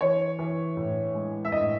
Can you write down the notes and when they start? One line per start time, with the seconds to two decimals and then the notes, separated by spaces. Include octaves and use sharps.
0.01 E3 C#5
0.39 E3
0.77 A2
1.15 G#3
1.45 E5
1.52 A2 D#5